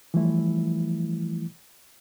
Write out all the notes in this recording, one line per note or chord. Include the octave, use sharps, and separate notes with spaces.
E3 F3 G3 A3 E4